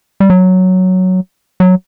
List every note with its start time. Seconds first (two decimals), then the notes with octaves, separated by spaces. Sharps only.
0.20 G3
0.30 F#3
1.60 F#3